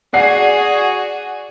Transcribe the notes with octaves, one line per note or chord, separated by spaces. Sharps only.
F#4 G#4 D5 F#5 C7